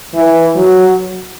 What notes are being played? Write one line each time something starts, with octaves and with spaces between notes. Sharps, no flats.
E3
F#3